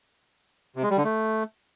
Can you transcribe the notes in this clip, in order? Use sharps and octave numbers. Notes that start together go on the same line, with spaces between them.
C3
G#3
G3
D3
A3